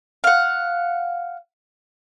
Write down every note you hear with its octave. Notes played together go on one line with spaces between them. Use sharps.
F5 F#5